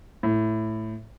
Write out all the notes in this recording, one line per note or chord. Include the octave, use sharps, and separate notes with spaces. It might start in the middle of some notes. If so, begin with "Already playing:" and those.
A2